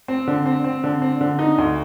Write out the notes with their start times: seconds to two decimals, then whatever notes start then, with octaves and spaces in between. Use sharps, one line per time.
0.08 C4
0.27 D3
0.46 C4
0.64 C4
0.84 D3
1.02 C4
1.21 D3
1.39 D#4
1.58 D2